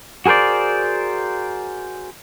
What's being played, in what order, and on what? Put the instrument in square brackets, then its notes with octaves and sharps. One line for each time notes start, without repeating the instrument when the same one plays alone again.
[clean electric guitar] F#4 G#4 A#4 C5 D5